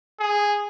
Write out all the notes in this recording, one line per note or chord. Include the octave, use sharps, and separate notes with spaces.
G#4